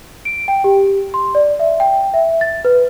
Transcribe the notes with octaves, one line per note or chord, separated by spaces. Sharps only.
D7
G5
G4
C6
D5
E5
G5
E5
A6
B4